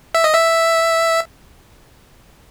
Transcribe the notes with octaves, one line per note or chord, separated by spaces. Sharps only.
E5
D#5
E5